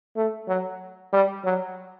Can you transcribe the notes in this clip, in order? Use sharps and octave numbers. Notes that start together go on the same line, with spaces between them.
A3
F#3
G3
F#3